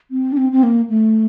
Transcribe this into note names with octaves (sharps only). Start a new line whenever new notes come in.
C4
D4
C4
C4
A#3
A3